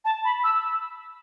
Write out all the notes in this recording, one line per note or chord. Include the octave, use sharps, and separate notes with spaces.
A5
B5
E6